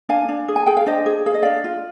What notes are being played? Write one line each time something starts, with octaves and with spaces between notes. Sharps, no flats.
D4 F5 G#5
D4
G#4
G#5
G#4 G5
F5
D4 C5 D#5
G#4
G#4 F5
D#5
D4 D5 F5
F4